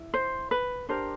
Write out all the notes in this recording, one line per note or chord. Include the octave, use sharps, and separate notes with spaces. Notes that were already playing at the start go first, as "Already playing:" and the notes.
Already playing: E4
C5
B4
D4 G4 A#4 C5